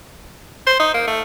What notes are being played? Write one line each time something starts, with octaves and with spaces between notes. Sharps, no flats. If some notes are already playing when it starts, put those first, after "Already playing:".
C5
D#4
A#3
A3